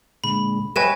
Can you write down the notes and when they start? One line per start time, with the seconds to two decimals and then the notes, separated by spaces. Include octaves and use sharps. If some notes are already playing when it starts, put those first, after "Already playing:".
0.24 A#2 D3 G#3 B5
0.76 G3 B4 C#5 D#5 E5 G5 G#5 E7